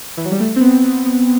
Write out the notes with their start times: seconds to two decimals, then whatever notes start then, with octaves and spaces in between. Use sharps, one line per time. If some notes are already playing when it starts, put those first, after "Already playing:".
0.17 E3
0.25 F#3
0.31 G3
0.40 A3
0.56 C4
0.61 B3
0.84 B3
1.06 B3